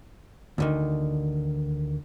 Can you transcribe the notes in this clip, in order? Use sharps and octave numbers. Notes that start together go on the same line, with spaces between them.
D2 D3 D#3